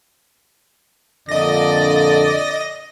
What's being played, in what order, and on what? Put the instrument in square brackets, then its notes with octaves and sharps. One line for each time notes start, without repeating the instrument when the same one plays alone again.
[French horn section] F2 A#2 D3 [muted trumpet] D5 [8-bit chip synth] D#5 A#6